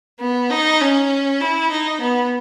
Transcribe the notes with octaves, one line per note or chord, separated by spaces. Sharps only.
B3
D#4
C#4
E4
D#4
B3